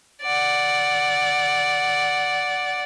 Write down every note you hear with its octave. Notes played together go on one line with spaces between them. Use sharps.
D5 F#5